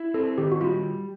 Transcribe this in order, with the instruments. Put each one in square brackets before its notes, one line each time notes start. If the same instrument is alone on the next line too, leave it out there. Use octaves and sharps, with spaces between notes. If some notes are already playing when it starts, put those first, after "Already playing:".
Already playing: [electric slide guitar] E4
[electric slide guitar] C4 [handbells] A4
[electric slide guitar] D#3 [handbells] G4
[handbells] F#4
[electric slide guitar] G3 [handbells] F4